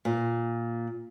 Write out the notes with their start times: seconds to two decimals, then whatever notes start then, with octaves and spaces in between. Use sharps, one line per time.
0.05 A#2